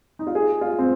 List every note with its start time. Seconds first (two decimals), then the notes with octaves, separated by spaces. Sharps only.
0.19 D#4
0.27 F4
0.35 G#4
0.61 F4
0.79 C4